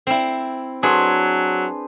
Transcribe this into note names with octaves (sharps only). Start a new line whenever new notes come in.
C4 E4
F#3 D4 G#4 B4 C5